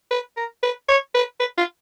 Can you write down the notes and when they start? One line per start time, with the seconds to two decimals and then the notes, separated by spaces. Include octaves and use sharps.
0.11 B4
0.37 A#4
0.63 B4
0.88 C#5
1.14 B4
1.40 B4
1.58 F4